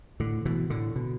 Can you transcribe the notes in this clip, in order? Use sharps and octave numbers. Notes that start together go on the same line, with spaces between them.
A2 D3
B2 E3
A2 D3
B2